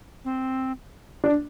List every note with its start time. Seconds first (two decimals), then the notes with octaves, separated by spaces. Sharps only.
0.24 C4
1.24 D4